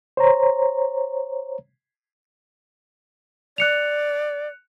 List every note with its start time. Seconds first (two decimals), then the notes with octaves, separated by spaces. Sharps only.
0.17 C5 C#5 A#5
3.58 D5 F#6 C#7 F7